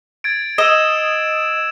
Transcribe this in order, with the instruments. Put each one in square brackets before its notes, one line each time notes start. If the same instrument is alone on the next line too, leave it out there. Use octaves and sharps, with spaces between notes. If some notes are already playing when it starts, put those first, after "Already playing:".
[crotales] G#6 A6 D7
[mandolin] D#5 [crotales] D#6 E6 E7